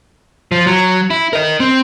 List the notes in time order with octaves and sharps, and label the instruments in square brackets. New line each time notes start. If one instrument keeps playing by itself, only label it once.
[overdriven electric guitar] F3
F#3
E4
A#4 D#5
C4